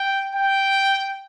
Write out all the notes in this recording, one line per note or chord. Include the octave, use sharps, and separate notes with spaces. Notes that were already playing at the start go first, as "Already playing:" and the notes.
Already playing: G5
G5